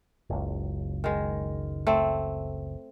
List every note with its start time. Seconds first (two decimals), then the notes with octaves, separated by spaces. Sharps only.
0.30 F#1 C#2
1.04 D#3 G#3
1.87 A3 C4